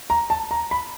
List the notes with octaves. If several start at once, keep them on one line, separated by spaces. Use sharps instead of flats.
A#5
A5
A#5
B5